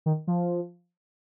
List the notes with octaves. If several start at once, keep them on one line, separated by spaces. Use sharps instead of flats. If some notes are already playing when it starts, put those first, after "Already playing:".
D#3
F3